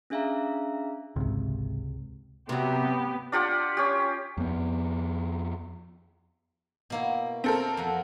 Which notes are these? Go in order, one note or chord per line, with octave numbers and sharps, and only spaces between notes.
C#4 D4 G#4 E5 F5 A#5
G#1 C#2 G#2 C3 C4
C3 F#3 B3 G4
D4 F4 G4 F#5
C#4 G4
F2 B3
B2 A#3 E4
C4 A4 A#4
F2 F#5